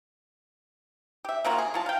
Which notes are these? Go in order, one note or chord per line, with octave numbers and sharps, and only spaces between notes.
G4 E5
C3 A#3 F4 F#4
G#4
F#3 F4 A5
F5 G5